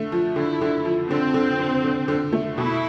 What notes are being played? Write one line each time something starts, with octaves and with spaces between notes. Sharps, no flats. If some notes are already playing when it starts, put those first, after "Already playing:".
Already playing: D3 A3
F3
D3 E4
D3
F3
D3 C4
D3
D3
D3
D3
A3
B2 E4